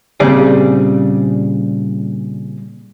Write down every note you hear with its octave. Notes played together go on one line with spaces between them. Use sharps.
A#2 C#3 G3 C4 D4 G#4